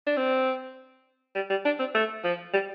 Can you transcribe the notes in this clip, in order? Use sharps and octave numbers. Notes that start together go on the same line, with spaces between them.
D4
C4
G3
G3
D4
C4
A3
F3
G3